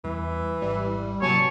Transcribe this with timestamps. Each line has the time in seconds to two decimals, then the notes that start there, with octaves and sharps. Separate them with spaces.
0.04 E2 E3 G3
0.62 G#1 G3
1.22 C3 E3 F#3 A#3 C#5 G#5 A5